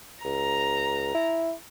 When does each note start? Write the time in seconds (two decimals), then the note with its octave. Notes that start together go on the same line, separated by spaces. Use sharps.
0.25 C#2 A#5
1.15 E4